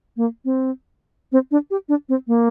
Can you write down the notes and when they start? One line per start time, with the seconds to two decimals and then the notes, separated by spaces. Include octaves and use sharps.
0.17 A#3
0.45 C4
1.32 C4
1.51 D4
1.71 G4
1.89 D4
2.09 C4
2.27 A#3